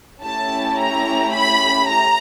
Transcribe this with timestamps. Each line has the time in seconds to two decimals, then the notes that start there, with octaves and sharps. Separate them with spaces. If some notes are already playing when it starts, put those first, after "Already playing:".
0.23 A3 C#4 E4 G4 A5
0.79 A#5
1.34 B5
1.89 A#5